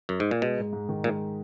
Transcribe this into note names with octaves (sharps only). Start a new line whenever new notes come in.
F#2
G#2
A#2
B2 G#3
G#2
G#2
D#3
A#2 G#3